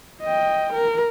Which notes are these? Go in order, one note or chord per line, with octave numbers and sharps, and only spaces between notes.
D#5 G5
A#4